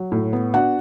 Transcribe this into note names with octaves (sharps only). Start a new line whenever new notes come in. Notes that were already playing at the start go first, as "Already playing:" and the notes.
Already playing: F#3
A2
B3
D4 F#4 F#5